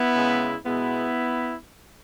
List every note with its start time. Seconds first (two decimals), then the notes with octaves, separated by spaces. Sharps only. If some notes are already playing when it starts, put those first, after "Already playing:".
Already playing: B3 E4
0.15 C#3 G#3
0.65 B2 G#3 B3 E4